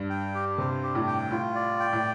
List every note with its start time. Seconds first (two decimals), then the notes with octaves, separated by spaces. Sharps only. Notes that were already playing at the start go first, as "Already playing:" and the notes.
Already playing: G2
0.10 G5
0.35 G4
0.58 C3 C5
0.83 G4
0.95 A2
1.07 G5
1.31 A2 F4
1.55 D5
1.80 G5
1.93 A2